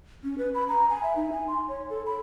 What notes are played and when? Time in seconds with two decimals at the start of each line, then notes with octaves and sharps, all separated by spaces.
0.24 C#4
0.38 B4
0.55 B5
0.68 A#5
0.89 G#5
1.03 E5
1.16 D#4
1.32 G#5
1.48 C6
1.69 C#5
1.90 A4
2.06 B5